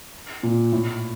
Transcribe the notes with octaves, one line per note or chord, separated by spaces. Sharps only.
A#2
A2